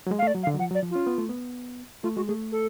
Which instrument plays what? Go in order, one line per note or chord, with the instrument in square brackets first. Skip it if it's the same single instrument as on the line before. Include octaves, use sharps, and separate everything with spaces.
[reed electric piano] F#3
G#3
[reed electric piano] A3 [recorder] F5
[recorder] D5
[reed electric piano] F#3
[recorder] F5
[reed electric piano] D3
F#3
[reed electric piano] F3 [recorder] F#5
[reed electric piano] F#3
[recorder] D5
[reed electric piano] F3
[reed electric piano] C#4 [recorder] F4
[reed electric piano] B3
A3
B3
[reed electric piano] A3 [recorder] F4
[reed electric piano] G#3 [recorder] F#4
[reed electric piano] A3 [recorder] G#4
[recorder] A4